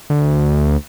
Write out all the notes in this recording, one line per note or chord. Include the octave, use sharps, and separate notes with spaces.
D2